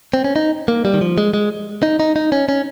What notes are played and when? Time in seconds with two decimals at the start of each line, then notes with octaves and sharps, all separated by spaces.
0.14 C4
0.24 C#4
0.36 D#4
0.68 A#3
0.85 G3
0.94 D#3
1.01 F3
1.18 G#3
1.34 G#3
1.83 D#4
2.00 D#4
2.16 D#4
2.32 C#4
2.49 C#4